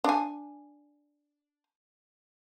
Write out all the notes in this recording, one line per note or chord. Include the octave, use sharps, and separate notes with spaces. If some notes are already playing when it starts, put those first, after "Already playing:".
D4 G#5